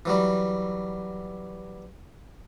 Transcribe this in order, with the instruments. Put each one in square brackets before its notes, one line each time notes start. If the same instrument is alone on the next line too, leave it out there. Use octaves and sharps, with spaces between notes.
[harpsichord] E3 F#3 G3